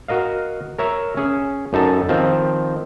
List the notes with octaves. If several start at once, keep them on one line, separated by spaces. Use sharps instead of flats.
F#4 A#4 D#5 F5
A#4 C#5 E5 A#5
C#4 G#4
F#2 D#4 A4 A5
D#3 F3 C4